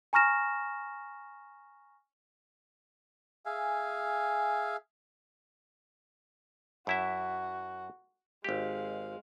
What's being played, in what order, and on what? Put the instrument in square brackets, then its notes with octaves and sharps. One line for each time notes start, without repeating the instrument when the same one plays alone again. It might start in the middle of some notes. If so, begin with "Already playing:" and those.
[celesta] G#5 A#5 C#6 F6 A#6 E7
[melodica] G#4 E5 F5 G#5
[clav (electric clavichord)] F#2 E4 E5 [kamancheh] F#4
[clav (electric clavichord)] G#1 G4 [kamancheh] G#3 F5